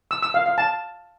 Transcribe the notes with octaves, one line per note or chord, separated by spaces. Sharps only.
E6
E6
F5
F5
A5